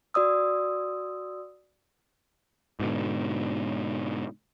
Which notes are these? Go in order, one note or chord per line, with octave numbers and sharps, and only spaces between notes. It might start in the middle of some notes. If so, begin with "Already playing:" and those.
F#4 D5 D#6 E6
G#2 B2 D3